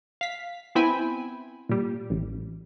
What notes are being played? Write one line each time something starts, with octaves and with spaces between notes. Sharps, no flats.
F5 B6
B3 C4 E4 G5 G#5 B5
A#2 G3
A1